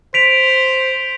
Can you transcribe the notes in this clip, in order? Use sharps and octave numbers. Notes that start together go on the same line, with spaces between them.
C5 B6 D7 F7